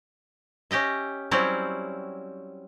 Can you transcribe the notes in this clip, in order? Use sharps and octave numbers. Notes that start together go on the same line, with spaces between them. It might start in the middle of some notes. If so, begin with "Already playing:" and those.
C#4 G4 D#5 E5
F#3 G3 C4 C#4 E4